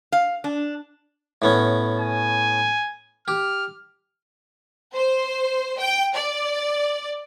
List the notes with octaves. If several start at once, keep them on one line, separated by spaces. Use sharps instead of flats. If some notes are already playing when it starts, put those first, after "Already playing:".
F5
D4
A2 B3 C#4
G#5
G4 F6
C5
G5
D5